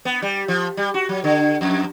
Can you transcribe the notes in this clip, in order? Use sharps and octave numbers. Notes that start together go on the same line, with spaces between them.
B3
G3
F3
G3
F#4
F#3
D3
F2